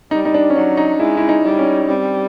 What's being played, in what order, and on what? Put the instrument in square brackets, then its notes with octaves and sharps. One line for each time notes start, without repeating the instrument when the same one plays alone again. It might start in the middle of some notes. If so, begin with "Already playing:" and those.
[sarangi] G3 [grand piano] D#4
[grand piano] D#4
D4
C#4
[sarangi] F#3 [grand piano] D4
[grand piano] D#4
[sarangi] G#3 [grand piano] E4
[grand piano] E4
D#4
[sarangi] G3
[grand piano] C#4
[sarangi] G3 [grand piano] C4